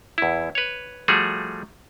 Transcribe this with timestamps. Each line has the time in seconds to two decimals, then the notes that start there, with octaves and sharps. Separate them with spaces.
0.18 E2 E4
0.55 B4 C#5
1.08 F3 G3 A3 F#4 G#4